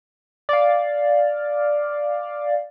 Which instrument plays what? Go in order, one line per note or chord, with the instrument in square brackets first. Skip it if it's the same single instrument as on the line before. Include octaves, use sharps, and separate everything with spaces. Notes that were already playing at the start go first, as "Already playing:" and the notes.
[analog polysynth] D5 F5